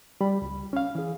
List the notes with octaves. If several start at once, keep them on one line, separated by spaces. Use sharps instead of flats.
G3 B5
C#2
C#4 F5
E3 G#4